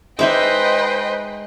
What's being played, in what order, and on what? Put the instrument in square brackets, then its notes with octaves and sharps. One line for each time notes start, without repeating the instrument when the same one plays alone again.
[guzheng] G#3 [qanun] D#4 E5 D6 [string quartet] B4 D#5 G5 [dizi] C5